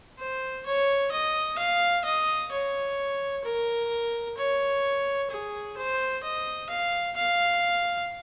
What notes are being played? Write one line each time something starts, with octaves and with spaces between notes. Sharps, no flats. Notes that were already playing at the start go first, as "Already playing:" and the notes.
C5
C#5
D#5
F5
D#5
C#5
A#4
C#5
G#4
C5
D#5
F5
F5